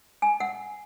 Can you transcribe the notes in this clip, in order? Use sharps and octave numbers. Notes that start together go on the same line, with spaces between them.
G#5
F#5